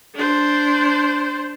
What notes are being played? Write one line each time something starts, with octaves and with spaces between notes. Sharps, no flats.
D4 C5